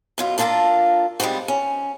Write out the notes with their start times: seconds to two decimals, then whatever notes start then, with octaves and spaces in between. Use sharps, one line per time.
0.18 F#2 B2 F4
0.38 A#3 D4 F4 G4 A4 A#4
1.20 G3 G#3 B3 C4 F#4
1.48 C#4